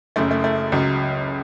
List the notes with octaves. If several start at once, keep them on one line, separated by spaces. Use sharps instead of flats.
F#1 F#2 C#3 A3
A3
A3
C#2 C#3 F#3